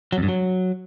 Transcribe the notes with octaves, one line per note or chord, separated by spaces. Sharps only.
F#3
F2
G2
F#3